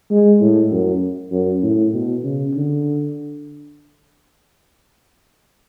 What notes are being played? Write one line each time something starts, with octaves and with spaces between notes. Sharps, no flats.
G#3
A2
F#2
F#2
A2
B2
C#3
D3